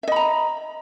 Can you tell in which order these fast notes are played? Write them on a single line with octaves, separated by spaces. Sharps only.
E5 D#5 B5 A#5